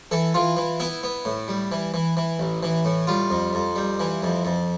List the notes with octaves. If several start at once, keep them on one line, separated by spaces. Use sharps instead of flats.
E3 A4
E3 F4
E3
B3 E4
B3
A2
G3
E3
E3
E3
A1
E3
A2
G3 F4
F2
F2
G3
E3
F2
F2